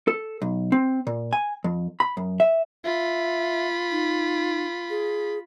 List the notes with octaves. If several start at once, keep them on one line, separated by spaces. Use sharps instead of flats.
A4
B1
C4
A#2
G#5
F2
B5
F#2
E5
F4 E5 B5
D#4
G#4